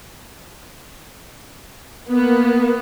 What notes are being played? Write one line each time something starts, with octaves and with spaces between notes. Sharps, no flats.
A#3 B3